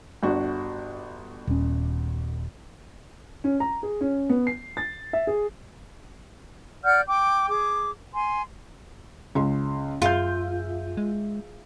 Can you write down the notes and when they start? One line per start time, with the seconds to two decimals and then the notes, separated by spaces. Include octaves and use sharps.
0.23 G1 D4 F#4
1.47 D#1 C#4
3.44 C#4
3.60 A#5
3.83 G#4
4.01 C#4
4.29 B3
4.47 C7
4.77 A6
5.13 E5
5.27 G#4
6.84 D5 F#5 F6 G6
7.08 G5 D6
7.48 G#4 D6
8.15 G#5 C6
9.35 C#2 C#4 C6
10.02 F#2 F4 G#4 E5 G6
10.97 G#3